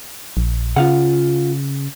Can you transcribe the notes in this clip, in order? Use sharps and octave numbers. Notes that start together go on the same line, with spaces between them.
A#1
C#3 F4 F5 F#5